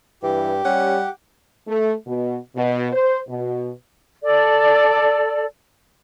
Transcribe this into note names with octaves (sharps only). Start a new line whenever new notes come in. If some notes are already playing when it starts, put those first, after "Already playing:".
G2 E3 G4
G3 C#4 F#5
A3
B2
B2
C5
B2
A4 D5